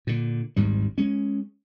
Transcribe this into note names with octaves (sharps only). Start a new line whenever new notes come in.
A#2 D3
G#1 D2 G#2 G3
G#3 C#4